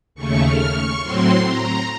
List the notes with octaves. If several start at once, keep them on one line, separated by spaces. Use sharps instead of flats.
D#2 C#3 A3 C#6
F6
C#6
A2 F#3 C4 C6
A#5